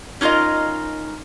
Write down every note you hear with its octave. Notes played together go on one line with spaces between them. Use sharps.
C#4 D#4 F4 A#4 D#5